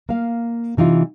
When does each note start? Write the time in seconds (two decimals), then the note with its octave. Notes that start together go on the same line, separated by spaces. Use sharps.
0.09 A#3 F5
0.77 C3 E3 D#4 F4